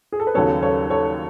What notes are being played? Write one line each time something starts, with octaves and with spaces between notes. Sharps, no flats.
G#4
A4
B4
D#2 C#3 F#3 B3 A4 C#5
A4 C#5
A4 C#5